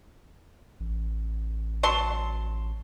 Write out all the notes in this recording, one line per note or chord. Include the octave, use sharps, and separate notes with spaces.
A1
F#3 A5 C6